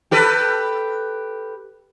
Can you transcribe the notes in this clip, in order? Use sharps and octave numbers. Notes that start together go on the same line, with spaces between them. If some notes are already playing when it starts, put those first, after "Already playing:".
G4 A4 B4